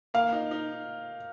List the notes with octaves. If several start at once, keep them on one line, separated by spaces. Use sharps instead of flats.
A#3 F5
D#4
D#4